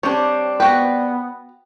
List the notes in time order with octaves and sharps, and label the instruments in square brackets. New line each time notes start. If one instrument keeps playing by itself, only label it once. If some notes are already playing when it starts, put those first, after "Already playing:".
[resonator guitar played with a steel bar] G3 C4 D4 [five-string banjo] C#5
[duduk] B3 [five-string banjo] F#4 B4 [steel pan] G5